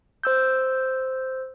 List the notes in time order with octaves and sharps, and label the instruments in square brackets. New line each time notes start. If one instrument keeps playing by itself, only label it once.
[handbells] C5 E6 G6